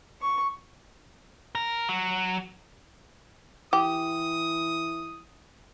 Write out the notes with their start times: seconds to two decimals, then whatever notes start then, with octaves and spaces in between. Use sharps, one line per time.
0.21 C#6
1.55 A#4
1.89 F#3
3.73 E3 G4 D#6